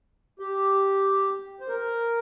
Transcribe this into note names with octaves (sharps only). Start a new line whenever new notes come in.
G4
C5
A#4